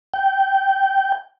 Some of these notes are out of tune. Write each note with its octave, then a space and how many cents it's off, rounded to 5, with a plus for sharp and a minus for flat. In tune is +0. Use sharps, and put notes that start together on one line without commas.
G5 -15